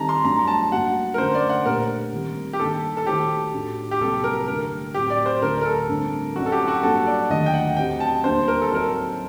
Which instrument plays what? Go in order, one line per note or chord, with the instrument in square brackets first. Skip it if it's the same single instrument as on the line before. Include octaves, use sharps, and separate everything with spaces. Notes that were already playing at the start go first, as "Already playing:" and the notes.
Already playing: [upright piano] D#3 G3 C4 D#4 A4 [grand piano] A5 A#5
[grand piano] C6
[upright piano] G2 F#3 A3 D4 [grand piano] A#5
[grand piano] A5
[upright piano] G2 F#3 A#3 F#4 [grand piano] F#5
[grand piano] A#4
[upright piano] F#2 D3 A3 [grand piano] C5
[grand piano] D5
F#5
[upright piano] A#2 A3 D4 G4 C5 [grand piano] A#4
[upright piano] D#3 G3 C4
[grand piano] G4
[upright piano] G2 D#3 G3 A#3 D#4 [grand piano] A4
[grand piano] A4
[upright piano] D#3 A3 D#4 F#4 C5 [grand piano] G4
[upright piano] A2 A3 D4 F#4 A4
[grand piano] G4
[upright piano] C2 C3 F#3 A#3 [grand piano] A4
[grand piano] A#4
[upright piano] G2 D3 A3 [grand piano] A#4
[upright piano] A2 F#3 C4 F#4 [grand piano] G4
[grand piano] D5
C5
[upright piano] D2 D3 A3 D4 A4 [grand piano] A#4
[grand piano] A#4
A4
[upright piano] G2 D3 A3 C4
[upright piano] F#2 F#3 C4 D#4 [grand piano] F#4
[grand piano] A4
G4
F#4
[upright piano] G2 F#3 A#3 [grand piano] A4
[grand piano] D5
[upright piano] D#2 D3 F#3 A3 D4 [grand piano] D#5
[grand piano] G5
F#5
[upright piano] F#3 C4 G4 [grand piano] G5
[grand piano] A5
[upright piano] D2 D3 G3 A#3 [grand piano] C5
[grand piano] A#4
A4
[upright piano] F#3 C4 D#4 F#4 C5 [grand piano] A#4